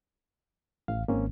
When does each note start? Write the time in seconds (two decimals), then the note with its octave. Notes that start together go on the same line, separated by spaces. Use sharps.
0.88 A1 F5
1.08 G#1 A#3 C4 C#4